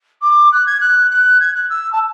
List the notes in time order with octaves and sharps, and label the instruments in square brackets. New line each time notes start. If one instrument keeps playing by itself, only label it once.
[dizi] D6
F#6
G#6
F#6
F#6
G#6
F#6
E6
A5